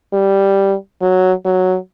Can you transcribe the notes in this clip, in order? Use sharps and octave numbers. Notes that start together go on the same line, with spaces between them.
G3
F#3
F#3